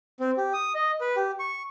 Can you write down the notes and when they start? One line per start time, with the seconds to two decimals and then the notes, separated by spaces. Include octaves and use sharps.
0.20 C4
0.37 G4
0.53 D#6
0.75 D#5
1.01 B4
1.16 G4
1.39 C#6